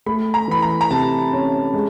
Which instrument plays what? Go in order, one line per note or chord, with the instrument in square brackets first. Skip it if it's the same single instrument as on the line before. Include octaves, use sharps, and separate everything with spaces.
[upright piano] A3 [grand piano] B5
[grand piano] A#5
[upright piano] E3 [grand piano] B5
[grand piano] A#5
A#5
[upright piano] C3 [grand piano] A5
[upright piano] C#4
G#3